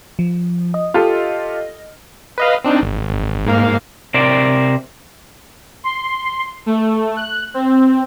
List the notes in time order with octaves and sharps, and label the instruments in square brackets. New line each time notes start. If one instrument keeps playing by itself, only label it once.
[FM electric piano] F3
D#5
[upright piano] F4 G4 A4
[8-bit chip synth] B4 D#5 F5
C4 D4 D#4
G#1
G#1
G#2 A#3 F5
[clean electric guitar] C3 A#4 C5 D5
[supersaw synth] C6
A3
F#6
C4